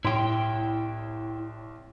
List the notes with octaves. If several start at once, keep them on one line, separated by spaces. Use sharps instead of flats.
C2 A2 E4 G5 C6